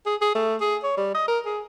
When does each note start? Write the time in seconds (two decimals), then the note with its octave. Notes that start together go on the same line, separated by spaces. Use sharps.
0.06 G#4
0.21 G#4
0.35 A3
0.61 G#4
0.83 C#5
0.97 G3
1.14 D#5
1.28 A#4
1.45 G#4